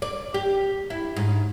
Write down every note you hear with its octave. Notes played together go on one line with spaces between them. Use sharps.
D5
G4
E4
G#2